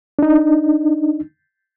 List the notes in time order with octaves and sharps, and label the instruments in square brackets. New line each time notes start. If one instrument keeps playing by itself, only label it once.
[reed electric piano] D4 D#4